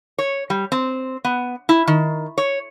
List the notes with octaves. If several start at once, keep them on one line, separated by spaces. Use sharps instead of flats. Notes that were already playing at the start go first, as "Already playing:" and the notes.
C#5
G3
C4
B3
E4
D#3
C#5